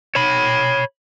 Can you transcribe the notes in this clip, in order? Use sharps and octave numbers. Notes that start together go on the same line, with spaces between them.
C#5 B5